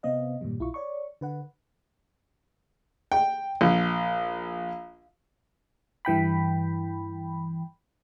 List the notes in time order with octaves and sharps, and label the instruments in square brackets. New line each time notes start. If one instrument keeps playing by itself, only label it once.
[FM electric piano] C3 B3 C4 D#5 F5
G2 A#2 D#3 F#3 G3
B1 E4 F4 C#6
C#5 D5 C#6
D3 B4 F#5
[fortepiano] G5
A#1
[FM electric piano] G2 E3 G5 B5